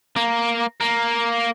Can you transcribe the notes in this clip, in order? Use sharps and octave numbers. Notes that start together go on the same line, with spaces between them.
A#3
A#3